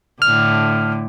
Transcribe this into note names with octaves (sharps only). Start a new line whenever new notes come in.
A2 D3 F6